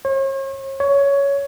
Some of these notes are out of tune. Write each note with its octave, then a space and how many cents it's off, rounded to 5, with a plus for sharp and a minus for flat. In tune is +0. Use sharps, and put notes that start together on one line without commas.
C#5 -40
C#5 +15